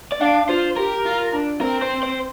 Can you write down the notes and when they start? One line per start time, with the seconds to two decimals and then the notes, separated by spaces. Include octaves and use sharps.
0.12 D5
0.21 D4 F5
0.49 F4 C5
0.77 G4 A#4
1.05 F4
1.33 D4
1.61 C4 A#4
1.82 C5
2.03 C5